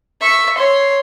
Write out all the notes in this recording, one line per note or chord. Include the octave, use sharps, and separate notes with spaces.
E5 C#6
C#5 C6